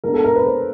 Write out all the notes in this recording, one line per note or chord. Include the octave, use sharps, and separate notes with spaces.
F3 G#3 B3 D4 A#4
A4
A#4
B4
C5